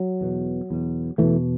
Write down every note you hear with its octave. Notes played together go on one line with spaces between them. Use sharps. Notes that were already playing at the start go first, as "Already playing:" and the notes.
Already playing: F#3
E2 B2
E2 B2
E2 B2 E3 A3